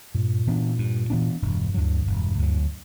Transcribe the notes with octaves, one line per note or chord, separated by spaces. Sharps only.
G2 A#2
E3 B3 D4
G2
E3 B3 D4
E1 G2
D2 D3 F#3
E1
D2 D3 F#3